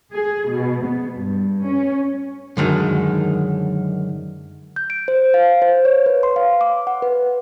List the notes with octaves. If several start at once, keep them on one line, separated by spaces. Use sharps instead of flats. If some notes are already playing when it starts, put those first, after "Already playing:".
G#4
B2
B3
G2
C#4
F#2 D3 D#3 G#3
G6
D7
C5
F5
C5
C#5
B4
C6
F5
D6
F#5
B4